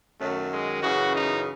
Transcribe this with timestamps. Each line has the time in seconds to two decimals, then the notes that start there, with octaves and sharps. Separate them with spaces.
0.19 F#2 D#3 F#3 A3
0.51 G#3
0.83 F#2 C#3 E3 F#4
1.15 D#4